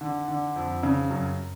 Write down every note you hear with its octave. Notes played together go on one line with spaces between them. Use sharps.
D3
D3
F2
C#3
F#2